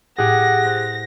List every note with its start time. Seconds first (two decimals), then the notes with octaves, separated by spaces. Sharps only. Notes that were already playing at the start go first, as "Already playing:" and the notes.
0.18 A2 G4 G#4 F#5 A#6
0.65 C5 F#6